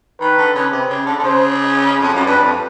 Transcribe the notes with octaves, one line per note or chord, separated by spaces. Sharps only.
D#3 B4
D3
C#3
C3
C#3
D3
D3
C#3 C5
F2
F#2
G2 B4
F2